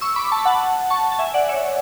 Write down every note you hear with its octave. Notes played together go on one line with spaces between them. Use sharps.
C#6 E6
B5 D6
A5 C#6
B5
F#5 A5
A5 C#6
A5
E5 G#5
D5 F#5
C#5 E5